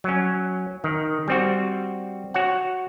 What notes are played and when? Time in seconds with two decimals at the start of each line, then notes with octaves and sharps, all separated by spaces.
0.04 F#3 C#4
0.84 D#3
1.28 G3 C4 F#4
2.34 F#4 C#5 F#5